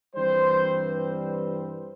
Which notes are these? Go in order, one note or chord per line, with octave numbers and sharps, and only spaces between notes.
G2 E3 G3 C4 C5